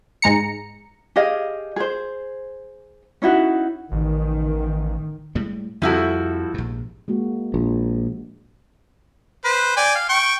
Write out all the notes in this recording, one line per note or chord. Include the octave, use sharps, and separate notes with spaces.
G#2 G#3 A#5 C#7
G4 G#4 D#5 F5
G#4 C5
C#4 D#4 E4 F#4
A1 D#3
A2 G3 G#3
C2 F2 F3 E4 F#4 A4
A#1 G#2
G#3 A#3 F#4
A#1
B4 C5
D5 G5 G#5
F5
G5 C#6